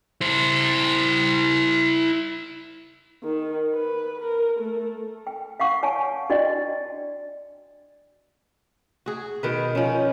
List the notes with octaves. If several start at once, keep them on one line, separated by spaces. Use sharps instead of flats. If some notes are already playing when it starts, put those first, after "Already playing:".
E4 C5
D#3
B4
A#4
A3
G5
F5 F#5 C#6
C#5 G#5 A5
D4 F#4 D5 D#5 G5
F#4 G#4
B2 D#3 B4
D#3 F3 C#4